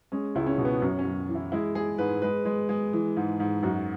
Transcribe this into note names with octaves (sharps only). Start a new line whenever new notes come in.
G#3 C#4
C#2 E4
C#4
B2
B3
F#2 C#4
C#4
F#2
E3
E4
G#3 E4
G#3 G#4
G#2 B4
G#3 B4
G#3
G#3
E3
G#2
G#2
F#2 F#4